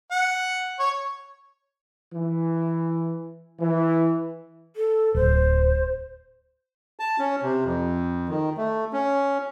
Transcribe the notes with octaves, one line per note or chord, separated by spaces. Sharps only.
F#5
C#5
E3
E3
A4
D1 C5
A5
C#4
C3
F2
D#3
A3
C#4